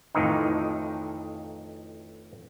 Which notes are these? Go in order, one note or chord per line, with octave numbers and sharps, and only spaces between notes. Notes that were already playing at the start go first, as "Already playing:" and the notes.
F2 A2 D#3 E3 D#4